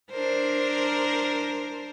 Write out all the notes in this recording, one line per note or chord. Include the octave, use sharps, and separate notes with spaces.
D4 A#4 C5